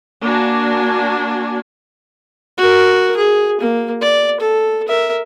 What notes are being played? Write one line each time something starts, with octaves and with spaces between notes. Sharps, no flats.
A#3 D4 F#4 G#5
F#4 A#4
G#4
A#3
D5
A4
A#4 E5